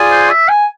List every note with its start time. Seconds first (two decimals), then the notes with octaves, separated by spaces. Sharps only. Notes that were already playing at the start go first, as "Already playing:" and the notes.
Already playing: F4 G#4 D5 G#5
0.11 C5
0.30 E5
0.49 G#5